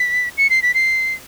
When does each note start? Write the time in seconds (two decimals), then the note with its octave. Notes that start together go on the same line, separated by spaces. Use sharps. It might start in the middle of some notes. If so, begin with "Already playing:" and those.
Already playing: B6
0.38 C#7
0.50 C7
0.62 B6
0.74 C7